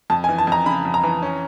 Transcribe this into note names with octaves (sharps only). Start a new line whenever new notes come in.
F2 A5
G#5
E3
A5
F2 A#5
C#3 B5
F2
A#5
E3
C#4